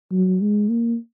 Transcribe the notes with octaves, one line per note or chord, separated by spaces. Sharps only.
F#3
G#3
A#3